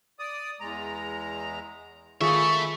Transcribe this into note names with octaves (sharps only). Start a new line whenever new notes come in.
D5 D#6
E2 G#3 A#5
D#3 F4 G#4 A4 E5 B5 C#6